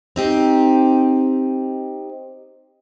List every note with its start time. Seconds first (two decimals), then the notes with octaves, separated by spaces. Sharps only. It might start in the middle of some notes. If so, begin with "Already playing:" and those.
0.16 C4 D#4 G4